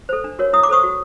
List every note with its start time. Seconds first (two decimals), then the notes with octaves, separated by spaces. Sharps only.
0.09 A4 C5
0.24 D4
0.39 F#4 A#4 C#5
0.53 E4 D#6
0.63 D6
0.69 A4 C5 C#6 D#6
0.83 F#4